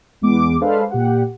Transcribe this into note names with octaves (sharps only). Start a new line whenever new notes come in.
E2 G#3 B3 D6
G#3 D4 A4 B4 C5 F5
A#2 G4 F#5